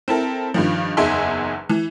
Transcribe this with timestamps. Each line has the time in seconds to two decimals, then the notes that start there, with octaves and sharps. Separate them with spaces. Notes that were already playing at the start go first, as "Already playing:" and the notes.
0.08 C4 E4 A4 A#4
0.54 G2 D#3 F3
0.97 F#1 E2 D#4 G#4 E5 C6
1.70 E3